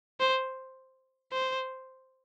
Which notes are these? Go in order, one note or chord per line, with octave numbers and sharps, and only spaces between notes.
C5
C5